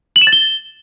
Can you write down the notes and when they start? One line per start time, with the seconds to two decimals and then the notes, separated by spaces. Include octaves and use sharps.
0.16 F#7
0.21 E7
0.27 A6
0.33 G7